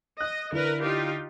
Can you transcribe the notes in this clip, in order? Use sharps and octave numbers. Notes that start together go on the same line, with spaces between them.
D#5 F#6
D3 E4 A#4 B4 D5
D#4 F4 G4